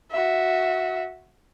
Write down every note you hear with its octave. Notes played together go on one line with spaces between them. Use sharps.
F#4 E5